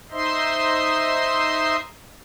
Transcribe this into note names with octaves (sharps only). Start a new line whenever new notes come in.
D#4 C5 D#5 E5 C6